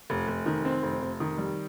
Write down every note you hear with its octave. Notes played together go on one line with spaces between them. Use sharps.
F1
F1
D#3
C4
F1
F1
D#3
G3